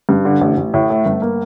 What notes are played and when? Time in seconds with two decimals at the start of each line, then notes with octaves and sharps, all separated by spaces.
0.09 G2
0.25 D3
0.41 A1
0.57 A1
0.74 A2
0.90 A3
1.06 G1
1.22 A#3